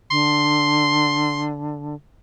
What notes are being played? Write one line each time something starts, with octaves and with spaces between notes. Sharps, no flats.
D3 C6